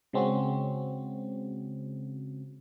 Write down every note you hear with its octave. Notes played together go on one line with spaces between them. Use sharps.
C#3 G#3 C4 C#4 F#4